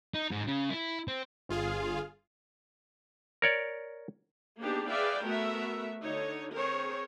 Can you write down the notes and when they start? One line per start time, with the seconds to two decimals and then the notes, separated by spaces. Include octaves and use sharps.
0.14 D#4
0.31 G#2
0.47 C#3
0.70 E4
1.08 C4
1.49 G1 F4 G#4 F5
3.42 A#4 C#5 D5
4.59 A#3 B3 D4 D#4 G4 G#4
4.89 G#4 B4 D5 E5 F5 G5
5.24 A3 B3 F#4 A#4 E5
6.04 D3 D#4 C#5
6.55 C4 G#4 A#4 C5 C#5